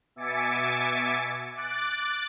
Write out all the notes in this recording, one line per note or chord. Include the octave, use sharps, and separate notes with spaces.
B2 E5 G#5 D6 A6 C#7
D6 F#6 A6